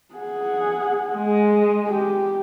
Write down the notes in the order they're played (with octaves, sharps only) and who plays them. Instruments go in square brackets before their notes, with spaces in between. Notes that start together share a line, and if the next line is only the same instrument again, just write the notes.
[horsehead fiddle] G#4 F#5
[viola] G#3
[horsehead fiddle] G4